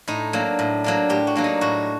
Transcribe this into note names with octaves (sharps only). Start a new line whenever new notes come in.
A2 D#4
F#3 A#3 D4
A2
F#3 A#3 D4
A2 G4
F#4
F#3 A#3 D4
D#4
A2 F#4